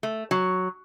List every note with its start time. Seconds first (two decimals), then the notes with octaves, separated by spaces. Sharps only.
0.03 A3
0.31 F#3